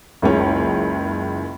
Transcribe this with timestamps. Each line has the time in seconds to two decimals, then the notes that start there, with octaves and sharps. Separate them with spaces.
0.22 F#1 C#2 C#4